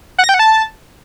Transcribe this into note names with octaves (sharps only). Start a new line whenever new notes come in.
F#5
A#6
G5
F#5
A5